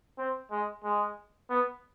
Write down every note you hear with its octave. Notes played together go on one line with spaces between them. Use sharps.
C4
G#3
G#3
B3